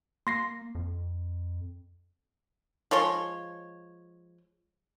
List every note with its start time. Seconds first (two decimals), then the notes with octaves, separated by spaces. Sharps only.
0.27 A#3 C6 A#6 C7
0.75 F2
2.91 F3 G#3 C#5 C6